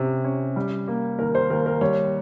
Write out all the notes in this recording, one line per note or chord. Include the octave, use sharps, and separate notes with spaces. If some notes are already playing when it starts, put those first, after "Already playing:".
Already playing: C3 C#4
C#4
G3
A#3
D#2 A#4
C5
D#2 A#4
A#4
G3 C#5